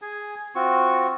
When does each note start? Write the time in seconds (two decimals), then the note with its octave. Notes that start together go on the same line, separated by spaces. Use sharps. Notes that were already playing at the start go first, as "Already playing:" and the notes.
0.02 G#4 G#5
0.55 C4 F4 F#4 C#6